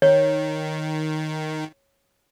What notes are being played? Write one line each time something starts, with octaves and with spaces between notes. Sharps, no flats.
D#3 C#5